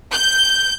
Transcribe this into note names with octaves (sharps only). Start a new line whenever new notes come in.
G6